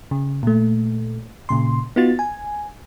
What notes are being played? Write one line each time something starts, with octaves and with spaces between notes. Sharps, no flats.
C#3
A#2 A3
A#2 C#3 C6
B3 D#4 F4 F#4 A6
G#5